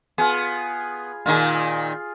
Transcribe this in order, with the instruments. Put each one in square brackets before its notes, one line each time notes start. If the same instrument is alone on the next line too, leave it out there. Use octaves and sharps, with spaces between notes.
[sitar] B3 [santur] F4 G#4
[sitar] A#2 D#3 [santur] F4 G#4